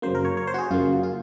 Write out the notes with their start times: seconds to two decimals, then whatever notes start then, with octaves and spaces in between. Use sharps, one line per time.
0.02 F#2 C#3 F#3 A#3 C5
0.15 A#4
0.25 C#5
0.37 C#5
0.47 C5
0.54 F#4
0.58 G#4
0.71 F#2 C#3 F#3 A#3 F4
1.03 F4